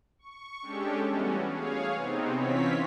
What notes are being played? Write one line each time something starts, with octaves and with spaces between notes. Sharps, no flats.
C#6
G#3 C#4 D4 G4 A4
E3 G3 A3 B3 C#4 F#4
G#4 C#5 F5
C3 B3 C4 D#4
E3 C4 C#4 F4 C#5 B6